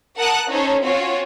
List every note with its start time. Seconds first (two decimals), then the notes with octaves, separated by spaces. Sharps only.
0.17 A#4 F#5 A5 D#6 F#6
0.50 C#4 D#4 A4 C5 C#5
0.83 C4 C#4 F4 F#4 C#5